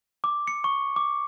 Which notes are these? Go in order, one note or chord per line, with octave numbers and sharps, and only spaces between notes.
D6
C#7
C#6
D6